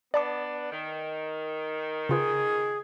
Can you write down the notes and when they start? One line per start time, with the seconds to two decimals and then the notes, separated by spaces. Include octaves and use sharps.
0.14 B3 D4 D5 A5 D6
0.72 D#3
2.09 C#3 F4 G#4 B4